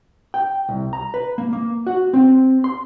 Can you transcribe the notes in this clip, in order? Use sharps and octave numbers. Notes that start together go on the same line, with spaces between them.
G5
C2
A#5
B4
A#3
A#3
F#4
C4
C6